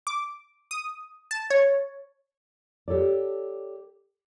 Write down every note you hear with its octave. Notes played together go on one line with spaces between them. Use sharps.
D6
D#6
A5
C#5
G4 A4 C#5 D5